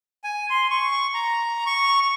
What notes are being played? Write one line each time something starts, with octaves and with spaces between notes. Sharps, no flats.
G#5
C6
C#6
A#5
C#6